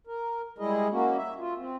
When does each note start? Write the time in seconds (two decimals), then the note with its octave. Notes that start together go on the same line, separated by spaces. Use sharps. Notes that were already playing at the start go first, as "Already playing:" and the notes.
0.07 A#4
0.58 G3 G#3 E4 G#4 D#5
0.91 A#3 C#4 F#4
1.17 E5
1.39 F4
1.57 C4